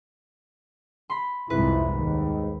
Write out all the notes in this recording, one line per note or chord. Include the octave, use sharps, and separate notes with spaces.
B5 C6
C2 F2 G#2 E4 B4
D#2 G#2 D#3